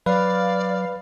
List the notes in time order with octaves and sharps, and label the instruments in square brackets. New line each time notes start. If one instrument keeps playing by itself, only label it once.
[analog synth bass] F#3 [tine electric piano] B4 [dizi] D5 [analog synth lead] F5